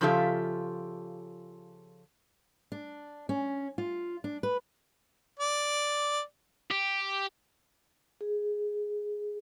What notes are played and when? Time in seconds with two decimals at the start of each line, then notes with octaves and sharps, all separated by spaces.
0.01 C#3 F3 F4 G4 A4 E5
2.72 D4
3.29 C#4
3.78 F4
4.24 D4
4.43 B4
5.39 D5
6.71 G4
8.21 G#4